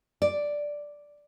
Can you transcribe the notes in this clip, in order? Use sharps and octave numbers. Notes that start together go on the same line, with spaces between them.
D5